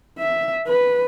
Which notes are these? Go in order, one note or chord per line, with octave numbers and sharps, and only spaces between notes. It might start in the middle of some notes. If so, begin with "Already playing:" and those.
E5
B4